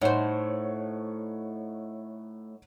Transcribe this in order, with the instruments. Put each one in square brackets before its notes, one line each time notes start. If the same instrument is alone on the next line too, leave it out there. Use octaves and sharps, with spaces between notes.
[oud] A2 C5 [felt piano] D#4 C#5 F#5